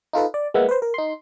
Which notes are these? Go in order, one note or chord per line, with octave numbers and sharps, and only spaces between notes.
D#4 F4 A4 B4
D5
G#3 A#3 B3 E5 F#5
B4 C5
A#4
D#4 C6